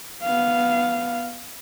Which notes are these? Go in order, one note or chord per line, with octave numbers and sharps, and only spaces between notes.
B3 F5